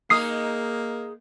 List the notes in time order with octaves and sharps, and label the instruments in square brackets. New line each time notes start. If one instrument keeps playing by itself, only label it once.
[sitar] G#3 D#4 G#4 [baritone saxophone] A#3 [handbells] D#6 C7